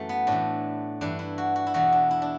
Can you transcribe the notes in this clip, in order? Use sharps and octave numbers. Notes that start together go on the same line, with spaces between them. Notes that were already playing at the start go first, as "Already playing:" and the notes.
Already playing: F#2 E3 A3
B3
A2 E3 D4
G2 E3 D4
E4
F#4
F#4
E4
E2 B2 F#4
D4
E4
D4